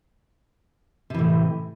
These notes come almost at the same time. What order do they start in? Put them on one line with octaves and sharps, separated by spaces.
C3 E3 A2